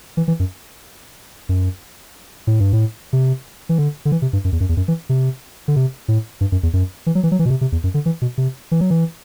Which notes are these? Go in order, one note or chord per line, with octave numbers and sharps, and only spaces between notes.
E3
E3
F#2
F#2
A2
G2
A2
C3
E3
D3
D3
E3
C3
G2
F#2
E2
F#2
E2
F#2
E3
C3
D3
C3
A2
G2
F#2
E2
F#2
E3
F#3
E3
F#3
E3
B2
C3
C3
E2
F#2
D3
E3
B2
C3
E3
F#3
E3